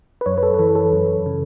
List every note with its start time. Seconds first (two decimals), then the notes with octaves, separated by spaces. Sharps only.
0.21 B4
0.26 F#2 C#5
0.38 B4
0.43 A4
0.54 B4
0.59 E3 A4
0.75 A4
0.93 F#2
1.26 C#3